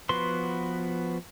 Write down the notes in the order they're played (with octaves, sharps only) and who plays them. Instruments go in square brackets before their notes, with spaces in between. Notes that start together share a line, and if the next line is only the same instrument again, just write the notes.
[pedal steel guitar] F3 B3 F#4 B4 C6